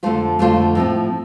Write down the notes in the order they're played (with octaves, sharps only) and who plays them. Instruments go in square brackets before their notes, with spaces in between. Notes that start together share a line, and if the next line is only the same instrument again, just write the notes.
[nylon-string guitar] F2 D3 A3 F4 C5
F2 D3 A3 F4 C5
A2 F3 A3 C4